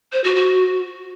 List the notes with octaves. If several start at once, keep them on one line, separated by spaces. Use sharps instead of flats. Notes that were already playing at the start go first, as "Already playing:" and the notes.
C5
F#4
F#4